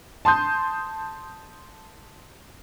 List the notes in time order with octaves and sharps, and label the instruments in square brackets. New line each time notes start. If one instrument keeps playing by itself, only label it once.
[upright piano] A5 C6 D#6 G6